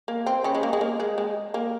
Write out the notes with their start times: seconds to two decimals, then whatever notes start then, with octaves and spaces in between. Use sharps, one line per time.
0.08 A#3
0.26 C4
0.44 C#3 C#4
0.55 G#3
0.63 A#3
0.73 G#3
0.81 A#3
1.00 G#3
1.18 G#3
1.54 A#3